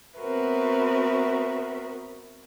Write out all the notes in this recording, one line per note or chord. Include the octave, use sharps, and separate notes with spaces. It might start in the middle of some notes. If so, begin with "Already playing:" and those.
B3 C4 F#4 A#4 B4 E5